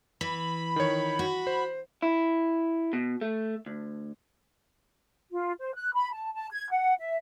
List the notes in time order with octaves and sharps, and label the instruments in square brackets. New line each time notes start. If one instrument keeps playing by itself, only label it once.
[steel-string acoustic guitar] E3 [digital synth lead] B5
[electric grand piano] D#3 C#5
[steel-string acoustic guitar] F#4
[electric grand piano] C5
[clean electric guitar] E4
B2
A3
D2
[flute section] F4
C5
F#6
B5
A5
A5
G#6
F#5
E5